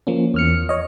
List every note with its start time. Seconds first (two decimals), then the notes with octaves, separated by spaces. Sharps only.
0.07 F3 A#3 C#4
0.34 E2 F6 C#7
0.69 C#5 D#5